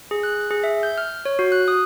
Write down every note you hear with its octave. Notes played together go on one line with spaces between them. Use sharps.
G#4
F#6
G#4
E5
G6
F6
C#5
F#4
F#6
D#6